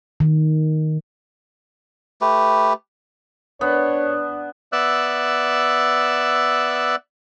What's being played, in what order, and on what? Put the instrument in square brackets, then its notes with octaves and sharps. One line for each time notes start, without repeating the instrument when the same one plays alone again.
[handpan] D#3
[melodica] A3 G4 B4
[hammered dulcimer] B3 [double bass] D4 [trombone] C#5
[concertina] B3 D5 E5 E6 F#6